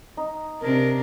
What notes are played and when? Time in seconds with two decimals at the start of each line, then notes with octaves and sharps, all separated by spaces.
0.17 D#4
0.61 C3 D4 A#4